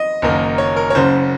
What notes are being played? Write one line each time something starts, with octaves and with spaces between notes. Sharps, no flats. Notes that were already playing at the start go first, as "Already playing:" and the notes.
Already playing: D#5
F#1 F#2 D#3 A#3 D#4
C#5
A#4
C#5
F#1 F#2 C#3 C5